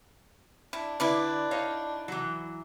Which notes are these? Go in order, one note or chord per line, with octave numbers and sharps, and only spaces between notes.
D4 E4
D3 E4 B4 D5
D#4 C#5 F5
E3 F#3